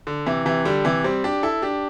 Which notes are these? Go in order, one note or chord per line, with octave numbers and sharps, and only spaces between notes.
D3
C3 E3
C3 E3
D3 G3
C3 E3
G3 C4
D4 G4
E4 A4
D4 G4